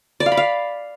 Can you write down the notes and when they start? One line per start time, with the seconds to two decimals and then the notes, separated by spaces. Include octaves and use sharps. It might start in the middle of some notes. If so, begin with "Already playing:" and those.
0.20 D5
0.26 F5
0.32 B5
0.37 F5